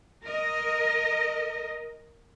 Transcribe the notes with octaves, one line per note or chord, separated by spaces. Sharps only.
A#4 D#5